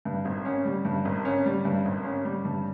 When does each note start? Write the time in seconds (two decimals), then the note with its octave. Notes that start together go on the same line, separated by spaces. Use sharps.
0.05 G2
0.25 G#1
0.45 C#4
0.65 G3
0.85 G2
1.05 G#1
1.25 C#4
1.46 G3
1.65 G2
1.85 G#1
2.04 C#4
2.25 G3
2.45 G2